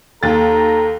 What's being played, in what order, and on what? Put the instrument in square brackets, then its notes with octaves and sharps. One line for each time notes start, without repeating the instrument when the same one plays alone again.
[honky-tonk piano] D#2 A6 [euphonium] A4 [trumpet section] A#5